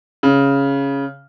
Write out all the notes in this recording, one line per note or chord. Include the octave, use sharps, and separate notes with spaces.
C#3